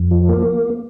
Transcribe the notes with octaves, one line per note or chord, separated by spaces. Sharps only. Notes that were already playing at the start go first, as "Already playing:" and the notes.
Already playing: F2
F3
A#3